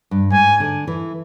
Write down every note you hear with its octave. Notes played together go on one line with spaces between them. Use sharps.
G2
G#2 G#5
D3
E3